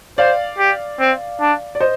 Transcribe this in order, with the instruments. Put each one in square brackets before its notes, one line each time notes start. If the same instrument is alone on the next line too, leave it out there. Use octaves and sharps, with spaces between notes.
[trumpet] C5 [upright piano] D5 F5
[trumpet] G4
C4
D4
[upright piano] D5
C5 D#5